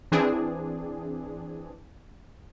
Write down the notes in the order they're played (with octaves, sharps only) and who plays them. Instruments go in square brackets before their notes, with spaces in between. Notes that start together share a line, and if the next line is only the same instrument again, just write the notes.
[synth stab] E3 C4 D4 G#4